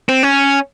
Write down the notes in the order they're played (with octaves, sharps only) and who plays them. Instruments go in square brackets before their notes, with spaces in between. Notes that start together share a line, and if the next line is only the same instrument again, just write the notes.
[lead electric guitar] C4
C#4